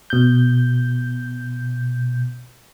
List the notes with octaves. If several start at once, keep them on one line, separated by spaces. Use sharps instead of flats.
B2 G6